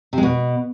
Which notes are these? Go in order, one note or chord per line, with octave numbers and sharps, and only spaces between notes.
C3
G#3
B2